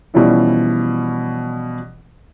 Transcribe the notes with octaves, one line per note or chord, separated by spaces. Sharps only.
B2 E3 F3 G3 C#4 E4